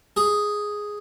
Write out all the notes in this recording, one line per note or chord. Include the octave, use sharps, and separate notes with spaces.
G#4